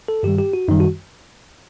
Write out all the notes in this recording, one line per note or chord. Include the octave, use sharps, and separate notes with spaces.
A4
G2 D#3 G3 G4
G4
F#4
F#2 D#3 G3 D#4
F#4